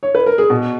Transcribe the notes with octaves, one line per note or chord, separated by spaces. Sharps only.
C#5
B4
A#4
G#4
B2 F#4